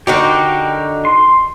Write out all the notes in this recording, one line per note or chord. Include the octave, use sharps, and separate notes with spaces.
D3 D#4 F#4 G4 A#4
C6